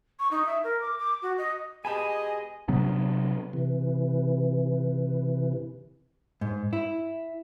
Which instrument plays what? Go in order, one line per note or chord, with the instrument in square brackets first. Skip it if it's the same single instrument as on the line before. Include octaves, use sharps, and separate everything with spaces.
[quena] C#6
D#4
E5
A#4
D6
D6
F#4
D#5
[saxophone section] B2 G#3 G#4 [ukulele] G4 A5 B5 [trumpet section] D#5 [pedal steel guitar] G#5
[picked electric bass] C3 F#3 B3 D4
[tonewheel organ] C3 E3
[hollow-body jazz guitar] G#2
E4